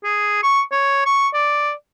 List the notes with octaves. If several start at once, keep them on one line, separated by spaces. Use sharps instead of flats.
G#4
C#6
C#5
C#6
D5